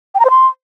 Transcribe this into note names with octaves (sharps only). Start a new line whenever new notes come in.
G5
A#5
C5
C6